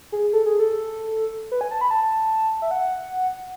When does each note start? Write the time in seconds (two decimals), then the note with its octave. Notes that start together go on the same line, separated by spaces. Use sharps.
0.12 G#4
0.33 A4
0.46 G#4
0.59 A4
1.51 B4
1.61 G#5
1.71 A5
1.81 B5
1.91 A5
2.62 E5
2.71 F#5